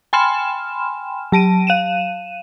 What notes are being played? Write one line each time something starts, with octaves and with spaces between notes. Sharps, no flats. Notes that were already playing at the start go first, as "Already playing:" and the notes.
G5 G#5 B5 C6 F6 E7
F#3 A5 D7 D#7
F5 D#7 E7